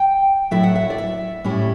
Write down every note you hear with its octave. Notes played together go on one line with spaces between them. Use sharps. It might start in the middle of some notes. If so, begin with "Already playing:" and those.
Already playing: G5
A2 F#3 A3 E4 E5
F#5
E5
D5
E5
A2 G3 C#4 E4